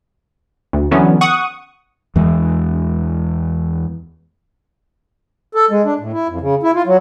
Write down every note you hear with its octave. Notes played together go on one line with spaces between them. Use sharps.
D2
D3 E3 F#3 B3 C#4
F#5 C#6 D#6
E2 E3 G#3
A4
G#3
D4
A2
E4
F2
C#3
E4
F4
F#3